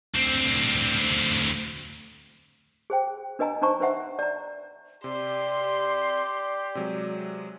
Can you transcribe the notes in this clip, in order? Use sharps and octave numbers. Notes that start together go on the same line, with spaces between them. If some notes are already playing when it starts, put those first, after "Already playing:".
D2 C4
G#4 C5 G5
D4 B4 D#5 G#5 A#5
D4 D#4 C5 A#5 C#6
D4 B4 C5 E5 F#5
D5 A#5
C3 G4 D5 C6
C3 F#3 G#3